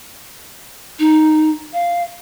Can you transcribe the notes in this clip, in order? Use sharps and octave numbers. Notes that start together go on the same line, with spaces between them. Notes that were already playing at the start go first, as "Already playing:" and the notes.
D#4
F5